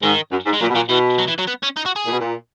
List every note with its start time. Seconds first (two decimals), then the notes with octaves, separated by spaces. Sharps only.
0.03 G#2 D#3
0.32 F#2
0.46 G#2
0.54 G#3
0.61 A#2 F#3
0.70 B2
0.75 A#2 F#3
0.89 B2 E3
1.19 F#3
1.28 E3
1.39 F#3
1.47 B3
1.63 C#4
1.77 D#4
1.86 F#4
1.96 G#4
2.06 A#2
2.12 B2
2.20 A#2